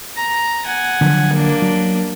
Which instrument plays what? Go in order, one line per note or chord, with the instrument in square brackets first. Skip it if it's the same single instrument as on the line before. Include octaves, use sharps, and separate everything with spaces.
[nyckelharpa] A#5
F#5 G#5
[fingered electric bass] D3 F3 F#3
[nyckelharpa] A#3 D4
[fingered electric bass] F#3